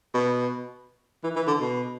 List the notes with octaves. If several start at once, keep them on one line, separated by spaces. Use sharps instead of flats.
B2
E3
E3
D3
B2